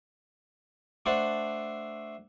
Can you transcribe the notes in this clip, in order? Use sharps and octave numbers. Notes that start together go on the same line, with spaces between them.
A3 D4 A4 C5 F#5